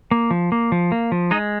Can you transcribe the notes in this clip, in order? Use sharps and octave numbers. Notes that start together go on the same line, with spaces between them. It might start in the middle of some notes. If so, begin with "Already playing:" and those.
A#3
F3
A#3
F3
A#3
F3
G#3 D#4 D#5